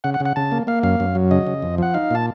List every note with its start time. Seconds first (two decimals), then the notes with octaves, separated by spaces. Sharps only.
0.04 C#3 F#5
0.14 F#5
0.20 C#3
0.25 F#5
0.36 C#3 A5
0.52 A#3
0.67 A#3 F5
0.83 F#2 F5
1.00 F#2
1.15 F#3
1.31 C#3 D#5
1.47 C#3
1.62 F2
1.78 F3 F#5
1.94 D#4 F5
2.11 A#2 A5